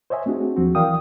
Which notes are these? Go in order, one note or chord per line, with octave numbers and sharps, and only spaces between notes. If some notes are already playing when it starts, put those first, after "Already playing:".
C5 C#5 D#5 E5 G#5
A3 C4 D4 F#4 G#4
D#2 F3 F#3 C4 F#4
E3 A#4 D5 F5 G5 D#6